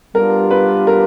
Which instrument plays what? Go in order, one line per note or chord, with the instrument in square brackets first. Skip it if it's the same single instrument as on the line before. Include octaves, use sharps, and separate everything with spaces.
[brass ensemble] G3 B3 D4 F4 [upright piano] A#4
[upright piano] B4
A#4